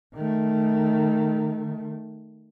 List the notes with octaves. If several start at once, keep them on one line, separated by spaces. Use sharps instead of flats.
D#3 A3